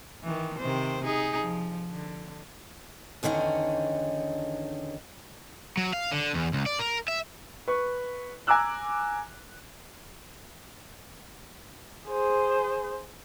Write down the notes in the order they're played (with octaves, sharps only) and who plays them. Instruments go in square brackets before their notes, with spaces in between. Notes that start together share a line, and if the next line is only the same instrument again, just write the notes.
[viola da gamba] D#3 E3
C3 D#3 C5
D#4 G#4
F3
D3
[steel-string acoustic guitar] E2 D3 D#3 C#4 D#4
[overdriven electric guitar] F#3
F5
D3
E2
C#2
D5
A#4
E5
[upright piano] B4 C#6
G#5 A#5 D6 E6 F#6
[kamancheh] G#4 C5